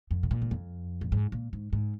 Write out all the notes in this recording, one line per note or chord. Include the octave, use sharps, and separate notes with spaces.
F2
C3
A#2
G#2
F2
A#2
G#2
A#2
G#2
G#2